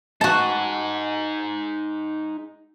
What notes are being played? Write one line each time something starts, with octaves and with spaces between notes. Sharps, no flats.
D#4 F#4 G#4 A5